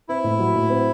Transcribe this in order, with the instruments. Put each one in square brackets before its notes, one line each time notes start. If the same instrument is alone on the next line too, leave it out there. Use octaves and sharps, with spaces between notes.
[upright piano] C4 [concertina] E4
[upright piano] A2
F#3
A2
C4